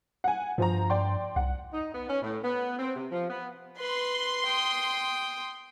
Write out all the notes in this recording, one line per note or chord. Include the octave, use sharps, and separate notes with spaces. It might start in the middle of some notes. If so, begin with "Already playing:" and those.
F#5 G#5
G2 F3 C5 A#5
D5 G5 C6
C2 F#5
D#4
B3
C#4
A2
B3
C4
C3
F3
B3
B4 C6
G5 D#6